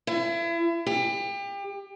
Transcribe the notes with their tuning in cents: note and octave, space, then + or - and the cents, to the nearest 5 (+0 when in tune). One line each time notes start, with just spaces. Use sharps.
E4 +35
G4 +30